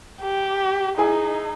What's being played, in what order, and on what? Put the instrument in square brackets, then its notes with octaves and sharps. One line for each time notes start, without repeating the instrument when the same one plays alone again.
[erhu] G4
[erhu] D#4 [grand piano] E4 G#4 G#5